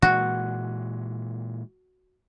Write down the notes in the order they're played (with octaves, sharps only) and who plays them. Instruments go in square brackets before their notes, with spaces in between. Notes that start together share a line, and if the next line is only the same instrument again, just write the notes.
[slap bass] A#2 E3 G#3 [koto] F#4